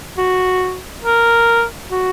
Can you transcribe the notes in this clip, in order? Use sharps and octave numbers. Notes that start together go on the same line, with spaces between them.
F#4
A#4
F#4